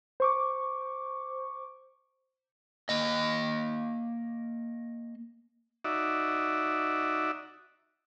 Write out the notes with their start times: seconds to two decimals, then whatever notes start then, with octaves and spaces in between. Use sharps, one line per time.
0.20 C5 C#6 D6
2.89 A#3 D#5
5.84 D#4 F#4 D5 E5